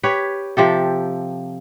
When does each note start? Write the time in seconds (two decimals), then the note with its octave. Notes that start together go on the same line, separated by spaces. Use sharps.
0.03 G4 B4 C#5
0.57 C3 F3 G4 A4